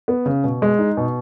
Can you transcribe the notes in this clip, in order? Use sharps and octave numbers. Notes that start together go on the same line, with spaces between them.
B3
C#3
B2
G#3
D#4
B2